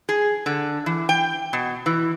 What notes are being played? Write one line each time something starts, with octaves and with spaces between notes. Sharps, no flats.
G#4
D3
E3
G5
B2
E3